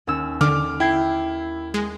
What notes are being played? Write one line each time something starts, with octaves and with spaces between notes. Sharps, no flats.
D#2 C#4 E6
D3 D6 F6
E4 G5 G#6 C7
G#3